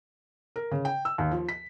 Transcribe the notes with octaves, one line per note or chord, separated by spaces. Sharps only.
A#4
C#3
G5
E6
D#2
F3
B6